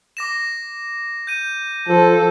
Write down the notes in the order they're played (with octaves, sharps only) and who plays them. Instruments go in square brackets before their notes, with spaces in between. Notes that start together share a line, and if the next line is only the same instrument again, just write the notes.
[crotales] D6 A#6 E7
G6 D#7
[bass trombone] F3 [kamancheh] A4